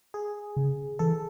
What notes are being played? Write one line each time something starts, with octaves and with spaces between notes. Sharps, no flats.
G#4
C#3
E3 A4